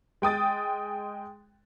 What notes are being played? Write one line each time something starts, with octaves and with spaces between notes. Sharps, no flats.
G#3 G5 D#6 A6